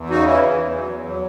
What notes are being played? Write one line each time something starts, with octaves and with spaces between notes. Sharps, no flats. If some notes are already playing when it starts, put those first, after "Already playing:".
Already playing: E2
C#3 D#4 F#4
E3 C#4 E4
E2
E2
F#3
E2
F#3